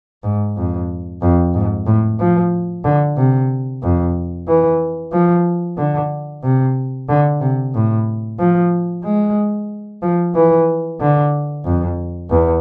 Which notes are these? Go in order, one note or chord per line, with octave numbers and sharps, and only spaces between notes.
G#2
F2
F2
G#2
A2
F3
D3
C3
F2
E3
F3
D3
C3
D3
C3
A2
F3
G#3
F3
E3
D3
F2
E2